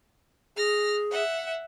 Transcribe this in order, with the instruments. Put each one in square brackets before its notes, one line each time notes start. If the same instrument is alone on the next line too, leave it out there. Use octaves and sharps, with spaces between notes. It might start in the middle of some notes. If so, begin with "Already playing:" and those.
[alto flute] G#4 [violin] F6 A#6
[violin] E5 F#5